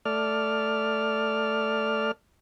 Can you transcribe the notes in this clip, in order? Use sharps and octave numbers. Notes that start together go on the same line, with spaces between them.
A3 D5 F6